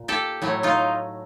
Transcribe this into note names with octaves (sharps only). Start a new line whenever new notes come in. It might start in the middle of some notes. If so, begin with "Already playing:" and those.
Already playing: A#2
G4 A4
A2 F#3 A3
D#4 F4